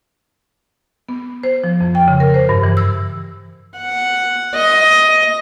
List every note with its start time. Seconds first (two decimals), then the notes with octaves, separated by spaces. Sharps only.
1.09 B3
1.43 C5
1.64 F3
1.81 F2
1.95 G5
2.08 C#3
2.20 A#4
2.34 C5
2.49 G2
2.63 E3
2.77 E6
3.78 F#5
4.55 D#5